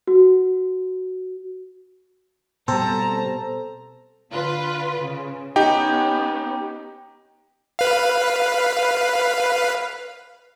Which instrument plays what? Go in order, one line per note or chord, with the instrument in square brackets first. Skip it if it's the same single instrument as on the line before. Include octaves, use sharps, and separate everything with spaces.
[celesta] F#4
[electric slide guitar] B2 G3 [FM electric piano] C4 A4 C5 [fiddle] A5 A#5
[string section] D3 F4 B4
C#3
[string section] B3 C#4 [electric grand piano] D#4 G4 G5
[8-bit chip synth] B4 F5